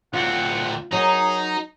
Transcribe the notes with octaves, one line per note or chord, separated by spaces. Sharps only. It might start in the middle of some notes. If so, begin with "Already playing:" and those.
D2 C4 F4 F#5
F#3 D#4 G#4 A#4